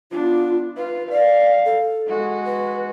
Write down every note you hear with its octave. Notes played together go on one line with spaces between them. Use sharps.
B3 D4 F4
F4 B4
D5 F5
A4
G#3 F#4
B4